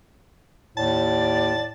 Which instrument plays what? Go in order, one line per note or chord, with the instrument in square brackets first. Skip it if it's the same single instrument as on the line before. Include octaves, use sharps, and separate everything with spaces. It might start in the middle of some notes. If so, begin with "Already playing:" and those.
[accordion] D#2 [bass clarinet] A2 [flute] D5 [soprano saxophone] A5